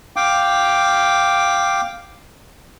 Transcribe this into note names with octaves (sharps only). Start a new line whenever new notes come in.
F5 G5 D6